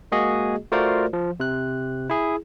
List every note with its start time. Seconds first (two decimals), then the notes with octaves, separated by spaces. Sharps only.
0.12 G#3 A#3 F#4 G#4 D#5
0.72 A3 F4 F#4 A#4 C5 D5
1.13 F3
1.40 C3 F#6
2.10 E4 G#4